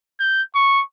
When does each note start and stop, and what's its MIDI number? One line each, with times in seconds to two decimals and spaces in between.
0.20 0.42 91
0.55 0.83 85